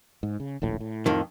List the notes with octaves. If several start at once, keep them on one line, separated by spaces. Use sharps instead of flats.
G#2
C#3
D#1 A#1 A2
A2
F2 D#3